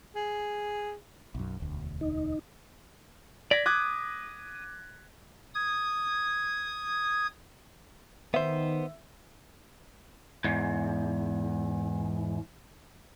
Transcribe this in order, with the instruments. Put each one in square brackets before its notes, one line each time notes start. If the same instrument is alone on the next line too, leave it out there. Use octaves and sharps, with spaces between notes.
[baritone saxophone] G#4
[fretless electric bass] B1 F#2
E1 D2
[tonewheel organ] D#4
[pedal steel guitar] D5 [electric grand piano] G#6 A#6 B6
[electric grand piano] D6 F#6 G#6 [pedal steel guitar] D#6
[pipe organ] D#6 G#6
[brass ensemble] D#3 [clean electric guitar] B3 C5 [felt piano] E5
[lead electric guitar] E2 G#2